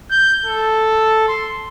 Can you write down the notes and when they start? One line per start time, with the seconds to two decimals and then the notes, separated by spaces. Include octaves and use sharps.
0.11 G6
0.46 A4
1.28 C6